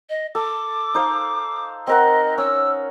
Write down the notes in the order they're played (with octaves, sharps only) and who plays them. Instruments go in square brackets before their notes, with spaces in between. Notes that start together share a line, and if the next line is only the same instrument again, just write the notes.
[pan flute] D#5
[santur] A4 [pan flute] D6
[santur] D#4 C5 F5
[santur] C4 A#4 F#5 [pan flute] D#5
[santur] C#4 [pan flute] E6